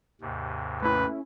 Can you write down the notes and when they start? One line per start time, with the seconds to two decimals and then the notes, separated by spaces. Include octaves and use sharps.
0.21 D#2 G#2 C3
0.82 A3 C#4 E4 B4